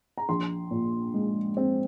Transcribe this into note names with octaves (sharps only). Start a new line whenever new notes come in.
A#5
A#1 C6
A#2
G#3
C4